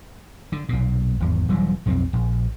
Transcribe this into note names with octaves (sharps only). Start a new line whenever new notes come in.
D3
B1 A#2
G#1 E2
E1 E3 F#3 G3
B1 F2 G3 C4
A#1